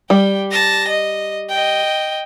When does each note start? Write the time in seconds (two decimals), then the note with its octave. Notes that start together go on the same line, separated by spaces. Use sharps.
0.10 G3 G5
0.52 A5 A#6
0.88 D#5
1.50 D#5 G5